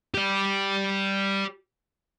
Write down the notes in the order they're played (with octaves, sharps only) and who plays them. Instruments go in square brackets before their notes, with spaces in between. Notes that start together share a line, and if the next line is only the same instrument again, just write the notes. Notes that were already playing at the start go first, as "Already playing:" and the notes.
[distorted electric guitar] G4 D5